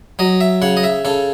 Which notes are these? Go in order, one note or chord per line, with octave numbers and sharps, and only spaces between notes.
F#3 D#5
E5
C#3 F#5
D#5
E5
C#3 A4